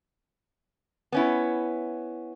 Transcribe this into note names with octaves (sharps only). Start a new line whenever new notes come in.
B3 C#4 E4